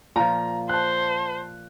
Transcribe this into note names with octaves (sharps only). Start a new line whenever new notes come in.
A#2 F3 A#5
C5 A5 F#6